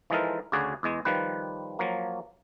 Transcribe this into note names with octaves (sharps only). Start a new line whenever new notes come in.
E3 F3 G#3 D#4 A4 A#4
D2 C#3 F#4 G#4 D5
E2 G#3
D#3 F3 G3 B4
F3 F#3 A#3